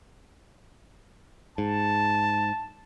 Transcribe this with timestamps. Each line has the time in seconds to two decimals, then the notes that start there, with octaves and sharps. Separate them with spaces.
1.58 G#2 A5